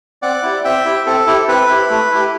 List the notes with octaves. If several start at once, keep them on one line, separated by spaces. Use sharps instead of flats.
C4 D5 F#5
E4 G4
C4 E5 G5
E4 G4
C4 A4
E4 G4
C4 B4
E4 G4
A3
E4 G4